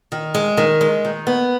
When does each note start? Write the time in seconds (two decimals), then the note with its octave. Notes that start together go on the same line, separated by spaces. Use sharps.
0.12 D#3
0.35 G#3
0.57 D#3
0.81 G#3
1.05 D#3
1.27 B3